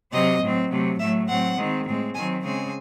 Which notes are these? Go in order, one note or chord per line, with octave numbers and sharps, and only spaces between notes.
C3 F#3 C4 D#5
A2 F#3 C4
C3 F#3 A3
A2 F#3 A3 E5
A2 F#3 C4 F#5
D#3 G#3 C4
A2 G#3 C4
D#3 F#3 C4 G#5
C#3 G#3 C4 G#5